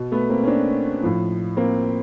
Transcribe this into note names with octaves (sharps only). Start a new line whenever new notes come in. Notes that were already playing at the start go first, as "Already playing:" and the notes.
Already playing: B2
A3 B3
A#3 C4
C#4
C4 D4
A2 F3
A#3 C4